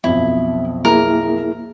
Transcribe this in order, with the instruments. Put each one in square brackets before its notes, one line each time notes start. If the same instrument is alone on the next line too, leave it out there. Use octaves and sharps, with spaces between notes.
[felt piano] B1 F2 [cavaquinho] E4
[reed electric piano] A#3 E4 G#4 [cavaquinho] A#4